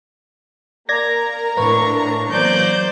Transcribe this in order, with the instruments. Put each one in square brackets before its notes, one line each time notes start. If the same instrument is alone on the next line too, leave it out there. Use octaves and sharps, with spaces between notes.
[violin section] A#3 A#4 A#5 [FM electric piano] D5 G#6 A#6
[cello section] A2 D4 [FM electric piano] B4 [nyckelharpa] C#6
[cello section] E3 F#3 A#3 [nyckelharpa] C5 D5 [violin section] G6